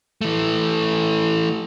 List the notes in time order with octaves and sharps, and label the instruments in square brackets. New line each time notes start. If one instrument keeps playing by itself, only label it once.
[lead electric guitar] E3 A3